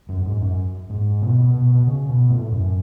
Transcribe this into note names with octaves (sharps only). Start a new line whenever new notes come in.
F#2
G#2
F#2
G#2
B2
B2
B2
C#3
B2
A2
F#2